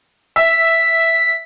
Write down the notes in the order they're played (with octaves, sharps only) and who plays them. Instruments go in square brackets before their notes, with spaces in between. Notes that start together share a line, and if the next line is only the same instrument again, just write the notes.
[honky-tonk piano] E5 [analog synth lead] B6